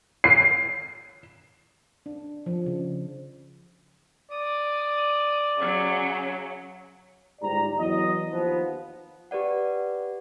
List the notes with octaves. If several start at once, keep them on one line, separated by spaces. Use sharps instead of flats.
C7
D4
F3
C#3
D5 D#6
C#3 F#3
G1 G#2 G3 D5 A#5
E2 F#3 D#5
D#2 F3 B3
G4 B4 D5 F#5